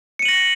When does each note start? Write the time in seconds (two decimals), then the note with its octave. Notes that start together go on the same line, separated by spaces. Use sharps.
0.19 C#7
0.22 D#7
0.25 F#7
0.28 A#6